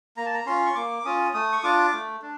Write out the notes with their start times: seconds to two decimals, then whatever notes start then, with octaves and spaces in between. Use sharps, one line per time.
0.17 A#3 A#5
0.26 A5
0.34 A#5
0.46 C#4 F4 C6
0.66 C#6
0.75 A#3 D6
1.05 C#4 F4 D#6
1.34 A3 D#6
1.52 C#6
1.63 D4 F4 D6
1.93 A3
2.22 D4